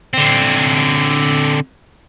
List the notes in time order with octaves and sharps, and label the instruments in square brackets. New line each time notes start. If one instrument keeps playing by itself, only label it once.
[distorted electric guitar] D3 C4